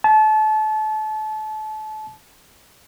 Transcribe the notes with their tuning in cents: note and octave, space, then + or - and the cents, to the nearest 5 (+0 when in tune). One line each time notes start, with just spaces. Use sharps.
A5 -30